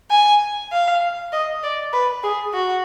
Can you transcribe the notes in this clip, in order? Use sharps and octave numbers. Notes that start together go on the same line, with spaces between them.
G#5
F5
D#5
D5
B4
G#4
F#4